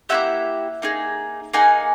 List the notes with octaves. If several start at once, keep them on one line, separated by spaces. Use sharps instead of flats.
A#3 C#4 E4 G4 E5 F#5
A#3 D#4 G#4
A#3 D#4 G#4 F#5 G#5